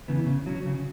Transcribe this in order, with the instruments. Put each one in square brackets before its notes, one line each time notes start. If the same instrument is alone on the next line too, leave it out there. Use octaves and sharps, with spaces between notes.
[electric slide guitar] C#3 E3 B3
C#3
F#3 C#4
C#3